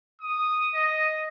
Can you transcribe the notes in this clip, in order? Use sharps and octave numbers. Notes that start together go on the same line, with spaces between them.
D#6
D#5